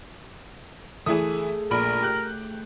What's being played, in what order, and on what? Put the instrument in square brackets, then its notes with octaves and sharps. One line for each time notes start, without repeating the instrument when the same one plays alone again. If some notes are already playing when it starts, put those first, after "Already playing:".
[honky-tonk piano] E3 E4 D#6 [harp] A3 G#4
[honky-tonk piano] A#1 B5 D7 [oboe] A#4
[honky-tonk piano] G4 F#6